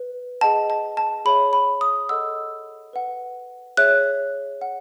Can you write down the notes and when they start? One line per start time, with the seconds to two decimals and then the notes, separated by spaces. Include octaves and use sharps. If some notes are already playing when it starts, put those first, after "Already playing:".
Already playing: B4
0.41 G#4 D#5 F#5 A5
0.70 A5
0.97 A5
1.25 G#4 C#5 E5 B5
1.53 B5
1.81 D#6
2.09 A4 D#5 F#5 E6
2.93 B4 F#5
3.77 G#4 C#5 E5 F#6
4.61 F#5